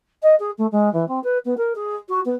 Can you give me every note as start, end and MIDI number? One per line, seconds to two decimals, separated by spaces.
0.22 0.35 75
0.39 0.50 68
0.57 0.66 57
0.71 0.92 56
0.93 1.07 52
1.08 1.21 60
1.23 1.38 71
1.45 1.56 59
1.57 1.73 70
1.75 1.95 68
2.08 2.20 66
2.25 2.35 59